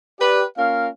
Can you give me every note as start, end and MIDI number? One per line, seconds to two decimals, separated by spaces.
0.20 0.44 67
0.20 0.44 71
0.20 0.44 74
0.58 0.89 58
0.58 0.89 61
0.58 0.89 65
0.58 0.89 70
0.58 0.89 77